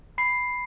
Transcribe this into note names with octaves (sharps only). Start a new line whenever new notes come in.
B5 C7